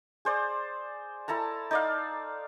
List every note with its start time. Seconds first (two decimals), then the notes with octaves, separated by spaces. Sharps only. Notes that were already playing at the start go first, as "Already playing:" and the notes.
0.25 G#4 C5 D5
1.28 E4 A4 A5 A#5
1.71 D#4 D5 F5